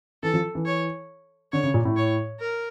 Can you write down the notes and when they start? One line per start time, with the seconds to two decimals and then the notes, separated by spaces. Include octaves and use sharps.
0.23 E3 A4
0.34 F3
0.55 E3
0.65 C#5
1.52 D3 C#5
1.63 C#3
1.74 A#2
1.85 A2
1.96 C#5
2.40 A#4